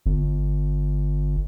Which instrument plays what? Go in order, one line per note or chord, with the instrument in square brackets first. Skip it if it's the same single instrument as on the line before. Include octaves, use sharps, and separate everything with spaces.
[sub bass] G1